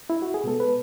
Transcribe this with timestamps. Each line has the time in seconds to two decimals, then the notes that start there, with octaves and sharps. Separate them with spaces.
0.10 E4
0.22 F#4
0.34 G#4
0.44 B2 G#3 B3 A4
0.60 B4